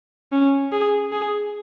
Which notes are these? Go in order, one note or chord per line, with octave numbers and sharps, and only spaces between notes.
C#4
G#4
G#4